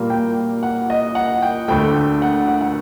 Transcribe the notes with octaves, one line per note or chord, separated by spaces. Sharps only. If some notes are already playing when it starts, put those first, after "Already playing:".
Already playing: A#2 G3 A#3
G5
F#5
D#5
F#5
G5
D2 D3 A3 G5
F#5
F#5
F#5